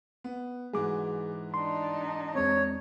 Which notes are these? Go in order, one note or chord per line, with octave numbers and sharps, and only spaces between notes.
B3
G#2 E3 F#4 G#4 D6
D4 D#4 C6
E2 G#3 C4 C#5